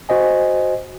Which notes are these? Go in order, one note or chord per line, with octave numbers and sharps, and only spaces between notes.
F#4 C5 D#5 G#5